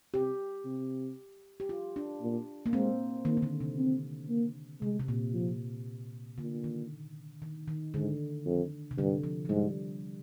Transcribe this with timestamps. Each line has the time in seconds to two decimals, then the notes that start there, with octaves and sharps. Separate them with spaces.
0.14 C3 G4
0.65 C3
1.60 G4
1.69 F4
1.96 D4
2.22 A#2
2.66 A#3
2.73 G#3 C4
3.25 D#3 A#3
3.37 D#3
3.42 D3
3.61 C3
3.78 C4
4.29 A#3
4.81 C3 G#3
4.99 C3
5.08 A#2
5.34 F3
6.38 A#2 D3
6.64 D#3
7.42 D#3
7.68 D#3
7.94 G#2 D3
8.46 F2
8.91 C3
8.98 G2 D3
9.24 F3
9.45 F3
9.49 G#2 G3